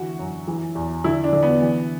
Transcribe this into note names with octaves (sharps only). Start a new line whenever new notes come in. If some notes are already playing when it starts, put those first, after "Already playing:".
Already playing: D3 E3 F#4
F#2
E3
E2
D3 E4
D4
D3
B3
E3